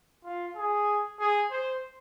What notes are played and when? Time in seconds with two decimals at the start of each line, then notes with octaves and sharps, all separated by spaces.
0.24 F4
0.57 G#4
1.19 G#4
1.51 C5